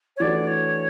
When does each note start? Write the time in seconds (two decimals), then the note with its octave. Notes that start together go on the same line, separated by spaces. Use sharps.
0.16 C#5
0.20 E3 A3 D4 F#4 D5
0.47 C#5